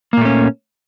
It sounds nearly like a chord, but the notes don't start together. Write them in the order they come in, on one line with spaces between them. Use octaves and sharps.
A#3 A#2 A3 C#4